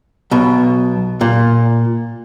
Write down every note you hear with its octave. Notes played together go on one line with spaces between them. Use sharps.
B1 B2
A#2